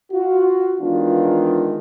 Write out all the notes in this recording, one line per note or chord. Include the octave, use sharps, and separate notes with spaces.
F4 F#4
D#3 E3 G#3 B3 D4 F4